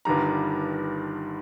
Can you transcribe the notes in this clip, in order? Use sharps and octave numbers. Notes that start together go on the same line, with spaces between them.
G1 G2 D#3 G3 A#5